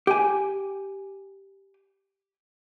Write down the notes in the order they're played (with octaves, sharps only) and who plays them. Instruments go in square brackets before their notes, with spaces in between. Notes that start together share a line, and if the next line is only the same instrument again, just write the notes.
[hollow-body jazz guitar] G4 G#5